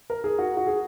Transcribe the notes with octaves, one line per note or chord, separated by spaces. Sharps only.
A#4
G#4
F#4
F#4
G#4